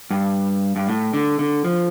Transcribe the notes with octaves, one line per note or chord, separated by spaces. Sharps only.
G2
G2
A2
D3
D3
F3